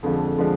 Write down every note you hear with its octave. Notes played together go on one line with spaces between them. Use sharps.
F2 D3 F3 G#3
D3 F3 G#3